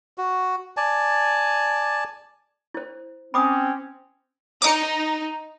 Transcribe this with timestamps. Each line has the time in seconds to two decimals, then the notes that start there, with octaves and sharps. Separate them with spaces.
0.18 F#4
0.77 D5 G#5 A5
2.74 E4 C5
3.34 C4 C#4 B5 D6 D#6
4.62 D#4 D6 D#6 C#7